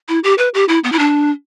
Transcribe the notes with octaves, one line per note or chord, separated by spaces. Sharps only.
E4
G4
B4
G4
E4
B3
E4
D4